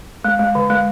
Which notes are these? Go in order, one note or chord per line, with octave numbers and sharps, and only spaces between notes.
G#3
G#3
D3
G#3